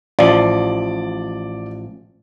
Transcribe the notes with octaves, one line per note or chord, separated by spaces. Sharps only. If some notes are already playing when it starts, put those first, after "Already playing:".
A1 F3 D5